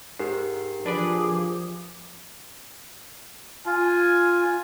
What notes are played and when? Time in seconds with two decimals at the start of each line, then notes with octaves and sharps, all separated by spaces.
0.19 G#2 G4 A#4 C7
0.86 F3 D4 G#4 B4 D5 D6
3.66 F4 G#5